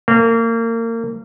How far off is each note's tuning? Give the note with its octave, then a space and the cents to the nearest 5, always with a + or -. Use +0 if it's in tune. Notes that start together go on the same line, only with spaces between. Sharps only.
A#3 -30